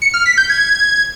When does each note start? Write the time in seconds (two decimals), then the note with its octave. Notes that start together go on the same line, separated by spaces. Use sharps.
0.02 C#7
0.14 F6
0.26 B6
0.38 G6
0.50 G#6